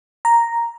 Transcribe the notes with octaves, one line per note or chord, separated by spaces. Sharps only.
A#5